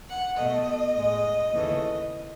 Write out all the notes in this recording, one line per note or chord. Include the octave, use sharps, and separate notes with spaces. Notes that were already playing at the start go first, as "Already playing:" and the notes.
F#5
B2 A3 D#5
A2 G#3
D#2 C#3 E3 A3